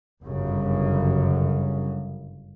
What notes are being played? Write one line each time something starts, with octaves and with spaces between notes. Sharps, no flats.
G1 F#2 C#3